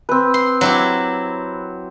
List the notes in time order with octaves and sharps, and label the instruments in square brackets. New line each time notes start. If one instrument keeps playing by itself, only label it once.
[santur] C4 B4
[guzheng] C6
F#3 E4 G4